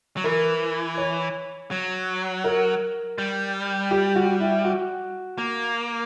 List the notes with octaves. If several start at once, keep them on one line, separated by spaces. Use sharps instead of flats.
F#3
E3 A#4
C#5
F#3
A#4
G3
G4
F#4
E4
F#4
A#3